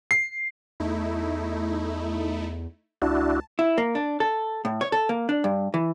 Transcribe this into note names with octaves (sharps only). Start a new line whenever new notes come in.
C7
E2 A3 D#4 E4
C#2 D4 E4 F#4 A5
E4
A#3
D4
A4
A2
C#5
A4
A#3
D4
G2
E3